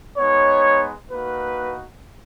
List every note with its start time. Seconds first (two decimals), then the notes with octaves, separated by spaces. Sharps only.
0.18 G#3 B3 D#4 C#5
1.11 A#3 D#4 F#4 B4